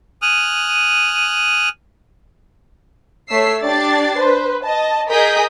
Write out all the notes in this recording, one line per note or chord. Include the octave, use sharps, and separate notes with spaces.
G#5 D#6 F6 F#6
A3 C#5 E6 B6 C7
D4 G4 D5 A6 C7
B4 C5
D#5 A5
G#4 A#4 D#5 D#6 G6 B6